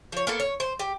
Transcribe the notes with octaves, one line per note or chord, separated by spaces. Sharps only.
F3 C#5
A#3 B3 A4
C#5
C5
G4